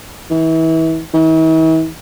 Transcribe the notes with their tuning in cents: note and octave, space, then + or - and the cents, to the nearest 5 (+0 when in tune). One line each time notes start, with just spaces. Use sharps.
E3 -30
E3 -45